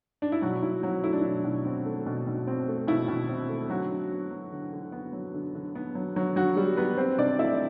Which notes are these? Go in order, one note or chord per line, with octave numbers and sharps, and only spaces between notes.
D4
E4
B2 F#3 F#4
B2 E4
F#3 C4 F#4
A3 E4
D4
B2 E4
B2
C4
A3
B2
B2
C4
A3
B2 E4
B2
C4
A3
D3 F#3 F#4
D3
B3
F#3
D3
D3
B3
F#3
D3
D3
B3
F#3
D3 F#3 F#4
D3 F#3 F#4
G3 B3 G4
F#3 B3 B4
C4 C5
C3 D4 D5
A3 E4 E5